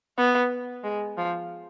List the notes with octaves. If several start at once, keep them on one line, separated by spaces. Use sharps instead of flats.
B3
G#3
F3